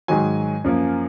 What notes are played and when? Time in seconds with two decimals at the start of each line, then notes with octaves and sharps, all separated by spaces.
0.08 G#2 D#3 F#3 G#5
0.64 F#2 F3 A#3